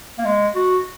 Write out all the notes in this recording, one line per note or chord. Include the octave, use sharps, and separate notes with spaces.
A#3
G#3
F#4